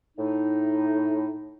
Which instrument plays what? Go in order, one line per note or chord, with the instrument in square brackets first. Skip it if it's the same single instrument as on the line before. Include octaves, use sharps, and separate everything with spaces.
[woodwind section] A2 D#4